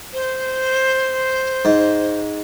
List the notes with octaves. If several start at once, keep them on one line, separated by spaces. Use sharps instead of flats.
C5
G#2